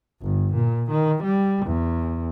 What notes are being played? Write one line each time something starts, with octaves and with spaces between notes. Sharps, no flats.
G1
A#2
D#3
G3
E2